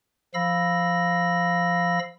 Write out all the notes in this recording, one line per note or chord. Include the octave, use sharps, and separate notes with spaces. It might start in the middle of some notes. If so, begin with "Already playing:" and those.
F3 F5 B5 E6 A#6